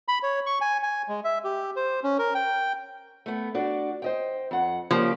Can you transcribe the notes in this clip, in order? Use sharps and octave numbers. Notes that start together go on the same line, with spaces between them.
B5
C#5
C#6
G#5
G#5
G#3
E5
G4
C5
C#4
A#4
G5
A3 B3
D4 F#4 D5
C5 D#5 G5
F2 F#5
C#3 F3 A#3 G4